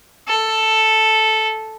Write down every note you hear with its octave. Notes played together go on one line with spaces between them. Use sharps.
A4